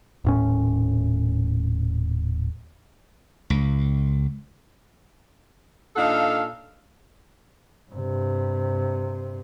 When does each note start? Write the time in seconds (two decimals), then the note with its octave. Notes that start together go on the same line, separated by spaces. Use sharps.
0.25 D#1 A2 C#4
3.50 C#2
5.96 A#2 D4 D#4 A4 F5
7.91 G2 C3